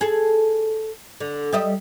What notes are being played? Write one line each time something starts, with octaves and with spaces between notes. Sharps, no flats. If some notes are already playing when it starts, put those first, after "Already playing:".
G#4 A4
D3
G3 D#5 E5